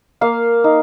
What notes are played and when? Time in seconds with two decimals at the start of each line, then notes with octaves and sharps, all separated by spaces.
0.21 A#3 F5
0.64 D#4